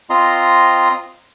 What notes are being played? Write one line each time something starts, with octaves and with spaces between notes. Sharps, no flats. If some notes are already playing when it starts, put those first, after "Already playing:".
C4 F4 D#5 A#5 C6